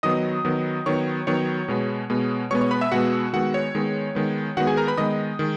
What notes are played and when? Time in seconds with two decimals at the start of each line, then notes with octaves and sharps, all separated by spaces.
0.03 D#3 F#3 B3 D#5 D#6
0.45 D#3 F#3 B3
0.86 D#3 F#3 B3 C#5 C#6
1.27 D#3 F#3 B3 C#5 C#6
1.68 B2 G#3 B3
2.10 B2 G#3 B3
2.51 B2 G#3 B3 C#5 C#6
2.61 C#5 C#6
2.71 B4 B5
2.81 E5 E6
2.91 B2 G#3 B3 F#4 F#5
3.33 D#3 G#3 B3 F#4 F#5
3.54 C#5
3.75 D#3 G#3 B3
4.15 D#3 G#3 B3
4.57 D#3 G#3 B3 F#4 F#5
4.67 G#4 G#5
4.77 A#4 A#5
4.87 B4 B5
4.98 D#3 G#3 B3 D#5 D#6
5.39 D#3 G#3